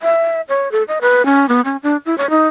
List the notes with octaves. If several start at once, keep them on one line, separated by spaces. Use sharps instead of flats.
E5
C#5
A4
D#5
B4
C#4
B3
C#4
D4
E4
C#5
D#4